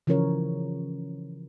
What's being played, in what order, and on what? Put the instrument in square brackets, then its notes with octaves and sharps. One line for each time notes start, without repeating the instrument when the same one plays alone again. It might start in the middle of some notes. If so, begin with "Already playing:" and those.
[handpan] C#3 E3 F3 C#4 A#4 C#5